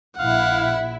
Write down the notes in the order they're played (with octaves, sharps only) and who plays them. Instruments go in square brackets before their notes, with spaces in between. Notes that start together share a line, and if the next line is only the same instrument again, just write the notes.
[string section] A#1 E4 [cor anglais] F5 [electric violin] F#5